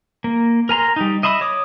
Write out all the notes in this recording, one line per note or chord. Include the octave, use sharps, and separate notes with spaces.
A#3
A#4 G#5 A#5 C6
G3 D#4
D#5 E5 B5 C6 D#6
C#5 D6 D#6